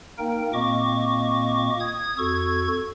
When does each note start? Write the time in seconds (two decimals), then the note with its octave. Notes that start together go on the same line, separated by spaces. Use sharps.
0.18 A#3 D#4 A#4 G5
0.53 A#2 A#3 C4 D#5 C#6 D6
1.80 D#6 G#6
2.18 F2 F#4 A4 C#6 G#6